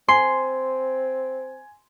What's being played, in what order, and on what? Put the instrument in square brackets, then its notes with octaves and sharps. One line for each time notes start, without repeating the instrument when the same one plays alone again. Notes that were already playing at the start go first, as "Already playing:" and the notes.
[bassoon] C4 [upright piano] G#5 [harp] C6